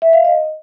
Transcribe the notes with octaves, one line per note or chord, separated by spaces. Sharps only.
E5
F5
D#5